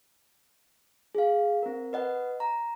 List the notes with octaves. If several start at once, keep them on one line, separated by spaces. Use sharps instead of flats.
G#4 F5
C4 A#4
B4 D#5 F#5
A#5